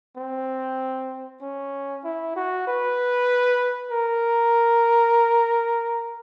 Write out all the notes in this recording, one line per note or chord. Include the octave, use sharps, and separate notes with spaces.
C4
C#4
E4
F#4
B4
A#4